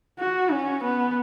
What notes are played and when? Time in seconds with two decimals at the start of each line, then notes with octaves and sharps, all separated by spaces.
0.18 F#4
0.51 C#4
0.84 B3